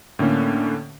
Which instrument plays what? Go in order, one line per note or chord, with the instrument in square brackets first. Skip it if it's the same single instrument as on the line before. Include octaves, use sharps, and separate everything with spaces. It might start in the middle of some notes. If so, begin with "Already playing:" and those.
[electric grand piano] A2 D3 A#3 C#4